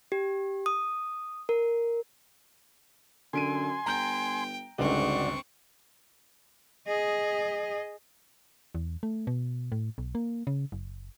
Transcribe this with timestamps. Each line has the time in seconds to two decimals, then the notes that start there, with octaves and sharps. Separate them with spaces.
0.12 G4
0.66 D#6
1.49 A#4
3.33 F#2 D3 G#5 C6 D7 D#7
3.86 G1 G5 A#5 G6
4.78 G1 C#2 G#2 C4 F#4 D5 C#6
6.87 G#4 D#5
8.75 E2
9.03 A3
9.27 B2
9.72 A2
9.98 B1
10.15 A#3
10.47 C#3
10.72 F#1